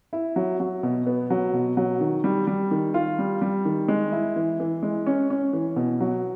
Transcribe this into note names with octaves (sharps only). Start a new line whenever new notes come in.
E4
F#3
F#3
B2
B3
F#3
B2
F#3
D#3
G3
G3
D#3
F4
G3
G3
D#3
G#3
E4
E3
E3
G#3
C#4
C#4
E3
B2
F#3